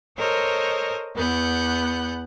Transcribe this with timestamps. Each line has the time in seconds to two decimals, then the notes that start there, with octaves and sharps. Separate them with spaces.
0.17 A4 A#4 C5 C#5 D#5
1.14 E2 B3 F#5 G6